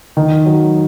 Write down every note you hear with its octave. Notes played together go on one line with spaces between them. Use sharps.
D#3
F#3